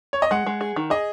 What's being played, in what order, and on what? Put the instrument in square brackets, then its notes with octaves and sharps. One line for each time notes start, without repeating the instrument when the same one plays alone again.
[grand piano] C#5
D#5
[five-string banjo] G#3 [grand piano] F#5
[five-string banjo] G#3
G#4
D#3
[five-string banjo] G#4 [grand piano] D#5